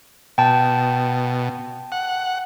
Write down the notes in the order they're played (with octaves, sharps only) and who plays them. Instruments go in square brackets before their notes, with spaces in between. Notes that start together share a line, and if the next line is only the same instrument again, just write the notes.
[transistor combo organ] B2 [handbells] G5 A5
[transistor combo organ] F#5